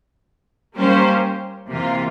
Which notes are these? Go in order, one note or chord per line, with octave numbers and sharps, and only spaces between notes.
G3 A#3 C#4 G4 C5
C3 E3 A#3 F4